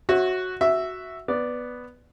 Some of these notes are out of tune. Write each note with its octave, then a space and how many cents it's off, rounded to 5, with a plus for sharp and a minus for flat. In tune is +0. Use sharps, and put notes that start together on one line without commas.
F#4 +0 C#5 -40 E5 -15
F#4 +0 E5 +0
B3 +0 D5 +0